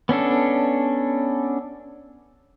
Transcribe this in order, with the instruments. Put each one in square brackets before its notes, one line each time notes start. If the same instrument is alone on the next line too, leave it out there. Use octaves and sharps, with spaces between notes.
[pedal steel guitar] B3 C#4 D4 A4